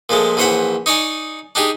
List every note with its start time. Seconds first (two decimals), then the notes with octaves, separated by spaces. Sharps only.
0.09 A#2 F3 G#3 A3
0.37 A#1 E3 C#4 C5 F#5 B5
0.86 D#4 C#5 D5 G#5
1.55 D4 D#4 G4 G#4